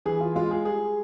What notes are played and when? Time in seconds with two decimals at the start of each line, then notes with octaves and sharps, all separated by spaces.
0.05 E3 G#4
0.21 F4
0.35 G#3 F4
0.51 G#4
0.65 G3 G#4